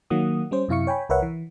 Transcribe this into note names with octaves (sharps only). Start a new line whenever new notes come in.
D#3 F#3 A#3 F#5 D#6
G3 C#4 C5
F#2 C3 E4 F5 C#6 C#7
C#5 G5 G#5 B5
C2 A#4 B4 C#5 E5 F#5
E3